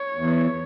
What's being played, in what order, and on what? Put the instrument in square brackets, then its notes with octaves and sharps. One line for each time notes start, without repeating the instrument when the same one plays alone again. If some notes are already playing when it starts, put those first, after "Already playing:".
Already playing: [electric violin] C#5
[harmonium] E2